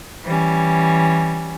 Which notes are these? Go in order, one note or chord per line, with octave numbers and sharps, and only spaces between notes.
E3 G3 C#4